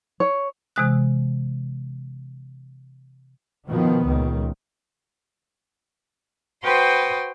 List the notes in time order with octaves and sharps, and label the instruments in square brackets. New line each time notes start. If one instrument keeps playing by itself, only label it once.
[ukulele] C#5
[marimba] C3 E3 G#3 D#6 F#6
[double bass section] B2 D#3 F3 B3
C#2 A#2 D#3
[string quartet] F#4 B4 C5 G5 C6 D#6